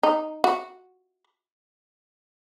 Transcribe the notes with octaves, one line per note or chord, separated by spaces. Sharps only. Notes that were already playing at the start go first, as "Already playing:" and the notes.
D#4
F#4